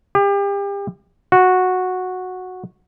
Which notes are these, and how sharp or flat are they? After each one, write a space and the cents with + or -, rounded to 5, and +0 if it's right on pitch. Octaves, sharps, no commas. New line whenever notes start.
G4 +35
F#4 -10